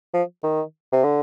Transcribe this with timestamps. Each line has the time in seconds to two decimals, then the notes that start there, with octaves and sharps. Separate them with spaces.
0.13 F3
0.43 D#3
0.92 C3
1.03 D3